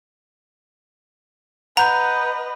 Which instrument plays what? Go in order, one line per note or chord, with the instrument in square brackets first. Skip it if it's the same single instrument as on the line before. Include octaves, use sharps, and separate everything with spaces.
[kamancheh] B4 D#5 [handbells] F#5 G6 [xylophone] A#5